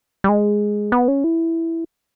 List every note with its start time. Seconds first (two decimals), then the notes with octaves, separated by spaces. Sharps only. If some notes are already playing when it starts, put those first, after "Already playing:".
0.24 G3
0.29 G#3
0.92 B3
1.08 C#4
1.24 E4